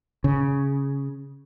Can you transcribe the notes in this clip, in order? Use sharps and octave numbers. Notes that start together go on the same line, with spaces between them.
C#3